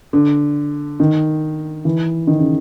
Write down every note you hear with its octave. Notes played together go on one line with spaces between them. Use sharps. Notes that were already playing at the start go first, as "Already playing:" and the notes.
D3
D#3
E3
D#3
C#3